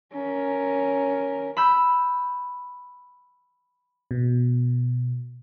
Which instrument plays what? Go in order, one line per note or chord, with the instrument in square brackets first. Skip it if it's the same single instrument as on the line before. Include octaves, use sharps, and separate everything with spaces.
[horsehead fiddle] C#4 A#4
[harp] B5 E6 G6
[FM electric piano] B2